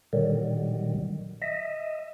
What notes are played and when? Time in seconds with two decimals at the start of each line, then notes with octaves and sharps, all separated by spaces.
0.13 A#2 D3 D#3 F#3 G3
1.42 D#5 E5